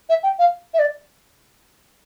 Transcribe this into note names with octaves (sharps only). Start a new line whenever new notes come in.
E5
G5
F5
E5
D5